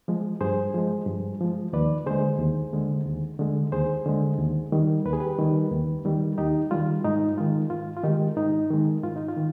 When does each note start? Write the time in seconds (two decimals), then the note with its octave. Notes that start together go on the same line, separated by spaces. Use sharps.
0.08 F3 G#3
0.41 G2 G#4 C5
0.74 F3 G#3
1.07 G2
1.41 F3 G#3
1.73 D#2 B4 D5
2.06 D3 G#3 G#4 C5
2.39 D#2
2.73 D3 G#3
3.06 D#2
3.39 D3 G#3
3.72 D#2 G#4 C5
4.06 D3 G#3
4.39 D#2
4.72 D#3 G3
5.05 D#2 B4
5.13 G#4
5.20 G4 B4
5.39 D#3 G3
5.71 D#2
6.05 D#3 G3
6.38 D#2 D#4 G4
6.71 D#3 G3 F4
7.04 G#2 D#4
7.37 D#3 G#3 F4
7.70 G#2 F4
7.97 F4
8.04 D#3 G#3 D#4 G4
8.37 G#2 D#4
8.70 D#3 G#3
9.03 G#2 F4
9.16 D#4
9.28 F4
9.37 D#3